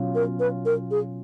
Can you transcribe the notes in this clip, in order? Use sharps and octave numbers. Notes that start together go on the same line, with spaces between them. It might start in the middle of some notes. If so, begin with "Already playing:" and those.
Already playing: B2 F#3 C#4 F4
A#4
B4
A#4
G#4